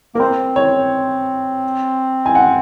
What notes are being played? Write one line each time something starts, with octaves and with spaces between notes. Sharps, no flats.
A#3 A#4
C4 C5
C#5
G#5
F#5